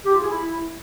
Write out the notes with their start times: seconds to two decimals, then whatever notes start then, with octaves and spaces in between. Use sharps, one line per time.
0.05 G4
0.13 F4
0.21 G#4
0.29 E4